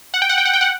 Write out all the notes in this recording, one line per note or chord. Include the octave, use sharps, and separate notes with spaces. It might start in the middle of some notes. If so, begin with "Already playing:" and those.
F#5
G5
F#5
G5
F#5
G5
F#5